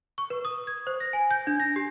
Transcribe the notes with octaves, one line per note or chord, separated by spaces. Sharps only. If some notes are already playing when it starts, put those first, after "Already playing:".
C#6
B4
D#6
G#6
C5
A#6
G#5
G6
D4
A#6
G4